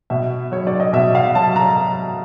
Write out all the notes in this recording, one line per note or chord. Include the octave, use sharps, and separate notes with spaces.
B2 E5
F#3 C#5
D5
D#5
B2 E5
F5
F#3 A5
A#5